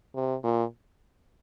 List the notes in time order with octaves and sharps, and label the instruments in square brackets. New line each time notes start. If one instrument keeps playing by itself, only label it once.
[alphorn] C3
A#2